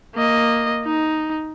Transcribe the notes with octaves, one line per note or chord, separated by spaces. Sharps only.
A#3 D#5
D#4